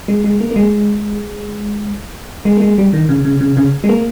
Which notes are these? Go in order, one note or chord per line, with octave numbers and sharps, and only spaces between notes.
G#3
G#3
A#3
A#3
G#3
G#3
A#3
G#3
G3
D#3
C#3
C#3
C#3
C#3
G#3
A#3